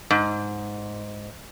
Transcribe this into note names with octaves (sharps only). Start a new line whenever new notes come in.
G#2